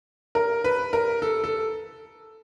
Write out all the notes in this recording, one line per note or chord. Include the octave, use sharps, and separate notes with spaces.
A#4
B4
A#4
A4
A4